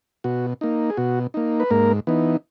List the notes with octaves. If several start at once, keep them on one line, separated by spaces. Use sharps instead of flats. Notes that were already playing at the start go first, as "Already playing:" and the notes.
B2 F#4
A#3 D#4
G#4
B2 F#4
A#3 D#4
B4
G#2 A#3 A#4
E3 B3 D#4